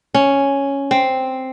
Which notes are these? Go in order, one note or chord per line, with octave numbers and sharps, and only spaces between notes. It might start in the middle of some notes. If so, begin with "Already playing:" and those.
C#4
C4